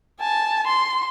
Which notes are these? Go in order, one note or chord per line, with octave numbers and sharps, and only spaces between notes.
G#5 A5
C6